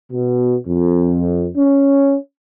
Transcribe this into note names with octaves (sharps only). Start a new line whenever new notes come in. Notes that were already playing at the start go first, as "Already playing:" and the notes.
B2
F2
C#4